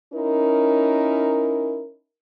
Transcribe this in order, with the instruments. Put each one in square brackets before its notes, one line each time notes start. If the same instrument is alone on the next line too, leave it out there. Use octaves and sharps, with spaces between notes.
[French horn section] C#4 D#4 E4 A#4